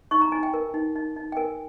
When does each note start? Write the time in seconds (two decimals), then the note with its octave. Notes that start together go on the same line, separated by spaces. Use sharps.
0.11 D#4 C#6
0.21 A#5
0.32 D#4 G#5
0.43 G5
0.54 A#4
0.74 D#4
0.96 D#4
1.16 D#4
1.32 G5
1.37 A#4 G#5